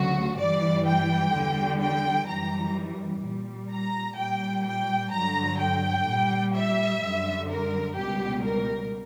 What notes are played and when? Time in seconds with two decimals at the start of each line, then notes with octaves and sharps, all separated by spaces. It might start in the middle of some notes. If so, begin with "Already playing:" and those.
Already playing: D2 C#3 F#3 F#4
0.39 G2 E3 G3 D5
0.86 G5
1.34 E2 D3 G3
1.81 G5
2.28 F#2 E3 G3 A#5
3.23 A#2 G3
3.71 A#5
4.18 A#2 G3 G5
4.65 G5
5.12 G2 D3 F#3 A#5
5.60 G5
6.07 A#2 G3
6.55 E5
7.02 F#2 D3 G3
7.49 A#4
7.96 C#2 B2 G3 G4
8.43 A#4